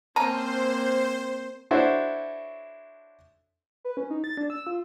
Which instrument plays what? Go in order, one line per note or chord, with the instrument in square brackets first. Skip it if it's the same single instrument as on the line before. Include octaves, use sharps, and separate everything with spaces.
[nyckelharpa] A#3 C4 [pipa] C#4 A#5 [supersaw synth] C5 [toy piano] A5
[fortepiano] D4 E4 F#4 A4 C5 C#5
[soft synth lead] B4
C#4
D#4
A6
D4
E6
F4